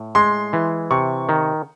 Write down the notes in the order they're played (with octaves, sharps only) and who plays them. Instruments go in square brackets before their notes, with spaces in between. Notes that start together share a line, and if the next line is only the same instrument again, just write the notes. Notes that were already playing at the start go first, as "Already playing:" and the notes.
Already playing: [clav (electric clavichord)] A2
[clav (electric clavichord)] G#3 [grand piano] C6
[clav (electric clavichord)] E3
[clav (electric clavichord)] C3 [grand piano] C#6
[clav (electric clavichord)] D#3